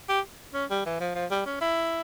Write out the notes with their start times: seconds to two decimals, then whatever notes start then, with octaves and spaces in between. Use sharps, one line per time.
0.09 G4
0.54 C#4
0.70 G3
0.86 E3
1.00 F3
1.15 F3
1.31 G3
1.46 C#4
1.61 E4